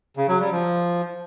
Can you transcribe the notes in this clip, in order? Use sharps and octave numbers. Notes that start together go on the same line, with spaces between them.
C#3
F#3
G3
F3